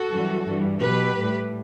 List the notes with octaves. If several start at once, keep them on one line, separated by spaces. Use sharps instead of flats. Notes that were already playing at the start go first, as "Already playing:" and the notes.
Already playing: F#4 A4
F#2 E3 G3
G2 E3 G3
B2 F#3 G4 B4
A2 G3